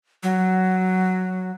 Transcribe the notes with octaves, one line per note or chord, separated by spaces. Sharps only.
F#3